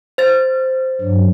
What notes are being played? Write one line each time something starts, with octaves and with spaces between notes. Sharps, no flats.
C5 A6
G2 F#3